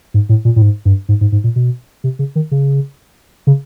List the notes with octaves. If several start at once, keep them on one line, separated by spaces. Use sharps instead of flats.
G#2
A2
A#2
A2
G#2
G2
G#2
G#2
G#2
A#2
B2
C3
C#3
D#3
C#3
C#3